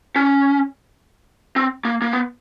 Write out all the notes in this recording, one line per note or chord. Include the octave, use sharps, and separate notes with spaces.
C#4
C4
A#3
A#3
B3